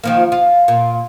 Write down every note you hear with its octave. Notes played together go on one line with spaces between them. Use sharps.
D#3 F3 A#3
F4
F4 F5
A#2